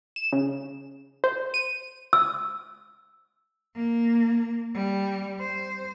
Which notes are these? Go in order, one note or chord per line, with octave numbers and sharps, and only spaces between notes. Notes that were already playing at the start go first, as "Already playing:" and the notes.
E7
C#3
C5
D#7
E6
A#3
G3
C5